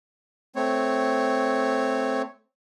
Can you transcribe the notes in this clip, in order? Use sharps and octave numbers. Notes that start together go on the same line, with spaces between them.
A3 C4 C#5